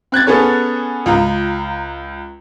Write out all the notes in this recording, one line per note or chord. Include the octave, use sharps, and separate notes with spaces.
C4 F#6 G#6 A6
B3 C#4 G#4 A4 C#5
C#2 F4 A#5